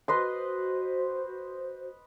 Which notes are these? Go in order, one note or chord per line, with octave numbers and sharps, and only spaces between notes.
F#4 B4 C5 D#5 C6